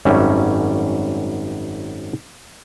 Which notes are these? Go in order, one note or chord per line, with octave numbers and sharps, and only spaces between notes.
G#1 F#2 G3 C#4 E5